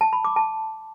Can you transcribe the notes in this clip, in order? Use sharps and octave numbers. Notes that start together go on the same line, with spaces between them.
A5
B5
D6
A5